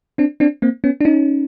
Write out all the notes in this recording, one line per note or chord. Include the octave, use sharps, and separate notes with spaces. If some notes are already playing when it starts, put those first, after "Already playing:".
C4 D4
C4 D4
A#3 C4
B3 C#4
D4
C#4 D#4